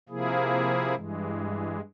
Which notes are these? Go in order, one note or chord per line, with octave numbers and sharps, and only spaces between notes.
C3 F3 A#3 E4 G#4
G2 E3 G#3